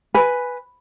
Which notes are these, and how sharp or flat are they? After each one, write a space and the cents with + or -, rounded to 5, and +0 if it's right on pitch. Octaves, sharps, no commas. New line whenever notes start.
B4 +0 G#5 +0